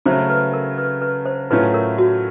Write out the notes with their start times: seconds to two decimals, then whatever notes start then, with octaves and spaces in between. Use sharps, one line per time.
0.06 C#3 F#3 A3 C5
0.30 B4
0.53 A#4
0.78 B4
1.02 B4
1.26 C5
1.50 A2 F#3 A3 C#4 F4 B4
1.74 A#4
1.98 F#4